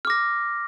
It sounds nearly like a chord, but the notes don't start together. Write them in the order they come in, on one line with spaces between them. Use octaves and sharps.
F6 D6 A#6